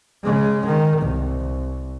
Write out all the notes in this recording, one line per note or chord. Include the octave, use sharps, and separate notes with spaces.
C#3 G#3
D#3
C2